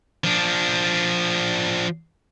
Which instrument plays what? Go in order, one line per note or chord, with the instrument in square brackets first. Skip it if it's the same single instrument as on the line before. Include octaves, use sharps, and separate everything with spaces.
[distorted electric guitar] F3 D4